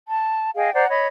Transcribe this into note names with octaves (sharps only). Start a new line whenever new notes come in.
A5
G#4 D#5 F5 G5
C5 D5 F#5 A#5
C#5 D#5 B5